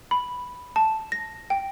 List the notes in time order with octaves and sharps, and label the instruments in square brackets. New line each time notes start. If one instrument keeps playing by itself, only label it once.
[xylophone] B5
A5
A#6
G5